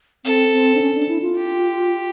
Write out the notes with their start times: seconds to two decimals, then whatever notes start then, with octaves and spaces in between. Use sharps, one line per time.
0.25 C4 A4
0.53 C4
0.75 D4
0.81 C#4
0.95 D4
1.08 E4
1.22 F4
1.36 G4